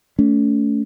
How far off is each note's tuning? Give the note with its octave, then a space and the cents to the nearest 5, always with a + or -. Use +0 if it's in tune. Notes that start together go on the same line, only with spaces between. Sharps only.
A3 +0 C#4 +35